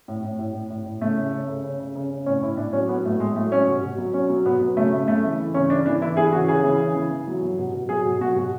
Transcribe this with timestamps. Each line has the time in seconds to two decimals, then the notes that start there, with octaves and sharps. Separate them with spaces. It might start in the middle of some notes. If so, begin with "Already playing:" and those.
0.08 A2
0.24 A2
0.39 A2
0.54 A2
0.70 A2
0.86 A2
1.01 C#3 A3
1.17 C#3
1.32 C#3
1.48 C#3
1.64 C#3
1.79 C#3
1.95 C#3
2.10 C#3
2.26 A2 C#4
2.43 A2 E4
2.57 A2 D4
2.73 F#3 C#4
2.89 F#3 B3
3.05 A2 A3
3.20 A2 G#3
3.36 F#3 A3
3.52 F#3 C#4
3.68 B2
3.83 B2
3.98 F#3
4.14 F#3 C#4
4.30 F#3
4.46 B2 B3
4.61 F#3
4.76 C#3 A3
4.92 C#3
5.08 C#3 A3
5.24 E3
5.39 E3
5.54 C#3 C#4
5.70 E3 D4
5.86 E3 D4
6.01 E3 E4
6.17 E3 G#4
6.32 C#3 F#4
6.48 C#3 G#4
6.64 E3
6.80 C#3
6.96 E3
7.11 E3
7.27 F#3
7.42 F#3
7.59 B2
7.74 B2
7.89 F#3 G#4
8.05 B2
8.21 F#3 F#4
8.36 B2